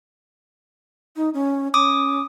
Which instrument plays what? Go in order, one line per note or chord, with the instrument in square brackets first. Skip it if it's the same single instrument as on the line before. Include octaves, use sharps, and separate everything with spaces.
[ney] D#4
C#4
[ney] C#4 [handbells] D6 D#6